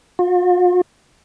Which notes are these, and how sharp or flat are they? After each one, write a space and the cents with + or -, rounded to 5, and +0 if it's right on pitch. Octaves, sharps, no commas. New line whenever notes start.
F4 +45